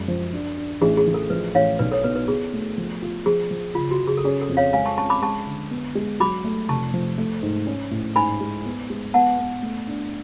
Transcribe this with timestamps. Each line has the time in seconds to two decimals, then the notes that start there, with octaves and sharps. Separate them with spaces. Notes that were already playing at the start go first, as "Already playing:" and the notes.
Already playing: F#2 G#3
0.08 F3
0.33 D4
0.57 D4
0.81 A1 G#4
0.97 G#4
1.07 A1
1.14 A4
1.30 F3 B4
1.55 A1 C#5 F5
1.79 B1 B4 D5
1.91 A4 C#5
2.04 B2 B4
2.16 B4
2.28 B2 G#4
2.53 A3
2.78 F3
3.02 F4
3.26 F3 G#4
3.51 F3
3.75 F#1 F4
3.91 F#4
4.00 F#1
4.07 G#4
4.17 A4
4.24 C#4 G#4
4.41 A4
4.49 F2
4.57 C#5 F5
4.73 G#3 F5 G#5
4.86 A5 C#6
4.98 C#4 A5 C#6
5.10 B5 D6
5.22 G#3 A5 C#6
5.47 D3
5.71 B3
5.95 G#3
6.20 F#3 B5 D6
6.44 A3
6.69 F1 A5 C#6
6.94 F3
7.18 A3
7.43 G#2
7.67 C#4
7.91 A2
8.16 G#2 G#5 B5
8.41 G#3
8.65 B3
8.90 G#3
9.14 B3 F#5 A5
9.38 B3
9.62 A3
9.87 D4